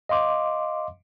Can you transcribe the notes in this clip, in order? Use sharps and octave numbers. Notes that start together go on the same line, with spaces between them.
D#5 F5 C6 D6